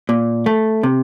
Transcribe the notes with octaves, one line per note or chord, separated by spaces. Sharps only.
A#2
A3
C3